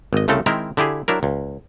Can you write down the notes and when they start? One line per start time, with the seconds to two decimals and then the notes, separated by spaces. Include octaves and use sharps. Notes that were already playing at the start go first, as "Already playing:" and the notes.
0.13 G#1 D#5
0.28 C2 C#3 A3 C4 A4
0.46 D#3 G#3 C4 E4 A#4
0.77 D3 E4 G4 G#4
1.08 F#3 D4 E4 A#4
1.23 C#2